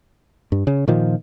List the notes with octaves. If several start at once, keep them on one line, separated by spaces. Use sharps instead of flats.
G2
C#3
A#2 D#3 F3